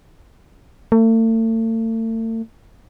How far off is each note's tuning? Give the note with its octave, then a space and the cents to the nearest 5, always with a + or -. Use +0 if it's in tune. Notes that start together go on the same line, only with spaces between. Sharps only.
A3 +40